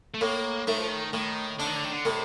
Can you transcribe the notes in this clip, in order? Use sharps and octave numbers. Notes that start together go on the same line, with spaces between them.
A3
A2 A#3
D#3 A3
F3
D#3
A2 D#3
D3 D4
D#3
D3
D#3
D3
A2 C3